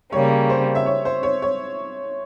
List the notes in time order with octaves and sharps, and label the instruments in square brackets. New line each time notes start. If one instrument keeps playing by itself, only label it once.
[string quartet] C#3 G3 A#3 [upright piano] C#5
[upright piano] C5
E5
C#5
C5
C#5
C#5